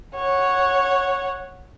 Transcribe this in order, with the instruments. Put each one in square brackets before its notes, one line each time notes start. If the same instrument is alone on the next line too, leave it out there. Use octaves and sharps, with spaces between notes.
[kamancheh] C#5 F#5